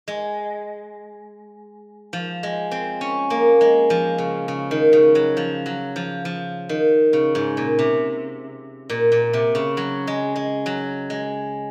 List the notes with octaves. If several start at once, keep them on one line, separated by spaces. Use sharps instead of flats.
G#3
F3
G#3
C4
C#4
A#3
G#3
F3
C#3
C#3
D#3
C#3
F#3
F3
F#3
F3
F3
D#3
C#3
G#2
A#2
C3
A#2
A#2
C3
C#3
F#3
G#3
G#3
F#3
G#3